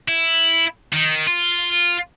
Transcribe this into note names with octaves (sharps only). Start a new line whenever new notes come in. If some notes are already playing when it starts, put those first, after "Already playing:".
E4
D#3
F4